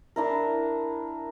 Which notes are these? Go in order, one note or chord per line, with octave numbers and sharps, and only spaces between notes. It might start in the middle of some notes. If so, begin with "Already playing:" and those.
D4 E4 A#4